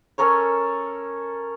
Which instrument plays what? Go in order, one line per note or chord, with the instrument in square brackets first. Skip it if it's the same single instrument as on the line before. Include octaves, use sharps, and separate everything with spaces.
[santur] C#4 A4 A#4 C#5